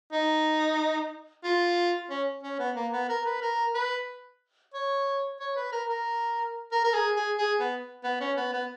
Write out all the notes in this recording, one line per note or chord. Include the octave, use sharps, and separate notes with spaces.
D#4
F4
C#4
C#4
B3
A#3
B3
A#4
B4
A#4
B4
C#5
C#5
B4
A#4
A#4
A#4
A#4
G#4
G#4
G#4
B3
B3
C#4
B3
B3